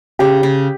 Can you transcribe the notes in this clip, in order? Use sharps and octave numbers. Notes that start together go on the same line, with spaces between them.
C#3 G4
C#3